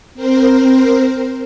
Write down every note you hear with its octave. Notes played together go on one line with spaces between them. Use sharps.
C4 A#4 C5